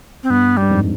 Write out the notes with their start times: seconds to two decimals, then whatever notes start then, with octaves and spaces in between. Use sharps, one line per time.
0.23 C4
0.30 G2 B3
0.57 G2 G3
0.70 F2 G#2